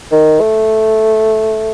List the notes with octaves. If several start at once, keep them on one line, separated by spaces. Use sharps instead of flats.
D#3
A3